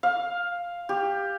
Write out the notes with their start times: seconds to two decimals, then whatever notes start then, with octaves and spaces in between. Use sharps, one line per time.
0.03 F5
0.89 G4